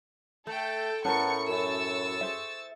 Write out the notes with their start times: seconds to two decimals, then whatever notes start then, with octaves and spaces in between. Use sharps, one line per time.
0.47 A3 A4 G5
1.05 E2 A2 C#4 A#4 F#5 A5 C#6 C#7
1.48 F#2 C#6 E6 A6
2.21 G#4 C5 E5